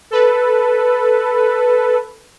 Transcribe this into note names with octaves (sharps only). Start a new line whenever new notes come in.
A4 B4